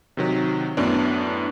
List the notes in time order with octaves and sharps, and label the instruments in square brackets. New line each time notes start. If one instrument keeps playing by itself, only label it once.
[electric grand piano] C3 D#3 F#3
F#2 A2 B3 C#4 D4